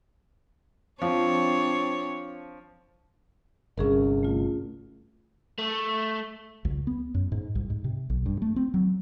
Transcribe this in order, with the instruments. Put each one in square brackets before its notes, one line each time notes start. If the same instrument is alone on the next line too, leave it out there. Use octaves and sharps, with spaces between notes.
[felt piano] F3 [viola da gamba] C4 D4 C#5
[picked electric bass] G1 C2 [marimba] C#4 G#4 A#4
[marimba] A3 F4
[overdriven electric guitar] A3
[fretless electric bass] C#2
B3
F#2
G#2
C2
G#2
C3
B1
G2
A3
C4
F#3